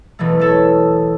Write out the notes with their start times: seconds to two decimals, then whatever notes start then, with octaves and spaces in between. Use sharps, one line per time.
0.19 E1 E3 A3
0.39 A3 A4 C#5